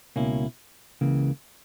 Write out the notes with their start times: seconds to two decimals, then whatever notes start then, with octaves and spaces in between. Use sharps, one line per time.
0.16 C#2 B2 A#3 C#4 E4
1.01 C#2 C#3 E3 A#3